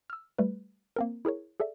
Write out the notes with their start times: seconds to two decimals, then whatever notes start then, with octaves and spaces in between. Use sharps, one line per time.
0.10 E6 F6
0.39 G3 A3 B4
0.96 A#3 C4 A#4
1.25 E4 G#4 A#4 C#5
1.60 G#4 A4 D5 E5